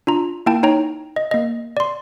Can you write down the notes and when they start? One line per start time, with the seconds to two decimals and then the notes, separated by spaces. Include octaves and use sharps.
0.07 D4 F4 A#5
0.46 A#3 E4 G5 A5
0.63 D#4 C#5 G5 A#5
1.16 D#5
1.31 A#3 D#5
1.77 D5 C6